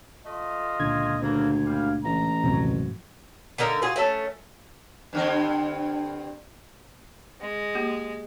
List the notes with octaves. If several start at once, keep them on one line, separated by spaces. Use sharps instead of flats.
A3 F4 D#5
C#2 A#2 D3 G#6
D2 C#3 E3 A#3
G3 F5
A1 A#5
A#1 D#2 G#2 C3 F#3
D3 A#3 D#4 A#4
F4 F#4 G#4
A3 C#4 A4
G2 D3 C4
G#3
A#3 G4